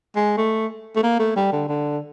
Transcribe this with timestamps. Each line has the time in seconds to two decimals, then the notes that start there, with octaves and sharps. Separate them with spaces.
0.16 G#3
0.37 A3
0.96 A3
1.03 A#3
1.19 A3
1.36 G3
1.52 D3
1.68 D3